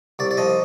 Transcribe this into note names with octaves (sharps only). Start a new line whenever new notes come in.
C2 D5
D5
F3 D#5